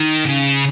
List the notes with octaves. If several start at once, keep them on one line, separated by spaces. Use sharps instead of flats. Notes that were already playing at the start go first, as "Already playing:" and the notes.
Already playing: D#3
C#3